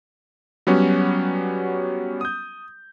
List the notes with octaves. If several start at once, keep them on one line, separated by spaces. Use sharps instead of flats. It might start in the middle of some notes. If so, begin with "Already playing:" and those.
F#3 G3 B3 C#4 F#4
D#6 G6